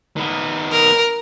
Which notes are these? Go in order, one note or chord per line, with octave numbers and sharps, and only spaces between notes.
D#3 B3
A#4